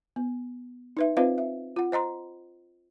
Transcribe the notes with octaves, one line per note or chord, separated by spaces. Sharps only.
B3
D#4 B4 E5
C4 F4 B4 C5 D#5 F5
E5
F4 F#5
C5 D#5 A#5 C6